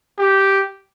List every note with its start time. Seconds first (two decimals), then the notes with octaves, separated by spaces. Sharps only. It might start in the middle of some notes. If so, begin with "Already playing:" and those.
0.18 G4